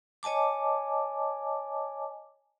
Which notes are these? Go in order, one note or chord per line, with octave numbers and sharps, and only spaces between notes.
C#5 D#5 G#5 A5 D6